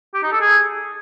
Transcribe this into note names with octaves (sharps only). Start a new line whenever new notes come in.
G4
D#4
A4
G#4